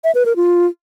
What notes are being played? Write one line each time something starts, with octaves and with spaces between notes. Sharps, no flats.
E5
B4
A#4
F4